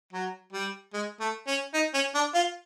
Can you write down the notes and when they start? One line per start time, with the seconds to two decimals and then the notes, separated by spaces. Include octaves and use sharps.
0.13 F#3
0.53 G3
0.93 G#3
1.20 A3
1.47 C#4
1.74 D#4
1.94 C#4
2.15 D4
2.35 F4